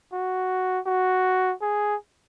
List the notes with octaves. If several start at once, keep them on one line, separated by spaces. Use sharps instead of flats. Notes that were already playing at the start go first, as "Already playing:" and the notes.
F#4
F#4
G#4